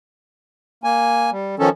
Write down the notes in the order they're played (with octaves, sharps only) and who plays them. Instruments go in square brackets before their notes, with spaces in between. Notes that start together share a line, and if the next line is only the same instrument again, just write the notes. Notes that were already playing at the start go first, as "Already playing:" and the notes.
[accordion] A#3 G#5
G3
D#3 F3 C#4 A4